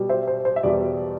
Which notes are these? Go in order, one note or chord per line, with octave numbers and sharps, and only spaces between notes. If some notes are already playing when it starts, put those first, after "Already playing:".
Already playing: B2 G3
C5 E5
C5
C5
E5
E2 B2 G3 D5